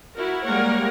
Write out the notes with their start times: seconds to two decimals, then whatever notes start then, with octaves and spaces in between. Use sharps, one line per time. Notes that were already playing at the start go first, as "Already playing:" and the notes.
0.15 E4 F#4 A#4
0.45 G3 G#3 A#3 A#4 C#5 F#5